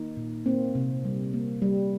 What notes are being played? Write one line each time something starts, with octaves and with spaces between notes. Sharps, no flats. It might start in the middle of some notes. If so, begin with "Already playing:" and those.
Already playing: D#3 A#3 D#4
A#2
A#3 C4
C3
G3
A#3
G3